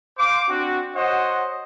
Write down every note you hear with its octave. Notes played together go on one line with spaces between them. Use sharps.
C5 F5 D6
C4 D4 F#4
F#4 C5 C#5 D#5 F#5